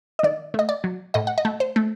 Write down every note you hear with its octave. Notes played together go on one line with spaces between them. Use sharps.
D#5
D#3 D5
A3 D#5
D5
F#3
A2 D#5
F#5
D#5
A3
C5
A3